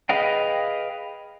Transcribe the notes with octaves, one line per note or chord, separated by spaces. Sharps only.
G#4 B4 D#5 F5 G5